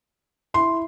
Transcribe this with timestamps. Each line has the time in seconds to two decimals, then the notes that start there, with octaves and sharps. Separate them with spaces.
0.54 E4 C6